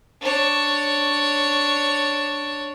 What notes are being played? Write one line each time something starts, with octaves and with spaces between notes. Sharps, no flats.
D4 C#5